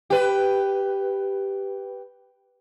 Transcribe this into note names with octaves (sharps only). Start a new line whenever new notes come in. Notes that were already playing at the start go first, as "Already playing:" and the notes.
G4 B4